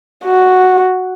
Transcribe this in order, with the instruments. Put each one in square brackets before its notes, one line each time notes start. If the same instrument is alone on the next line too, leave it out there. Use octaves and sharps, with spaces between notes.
[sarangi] F#4